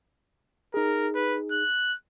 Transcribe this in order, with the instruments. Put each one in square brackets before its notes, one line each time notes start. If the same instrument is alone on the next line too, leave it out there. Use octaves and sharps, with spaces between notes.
[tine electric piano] D#4 G#4 [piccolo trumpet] A#4
[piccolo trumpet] B4
F#6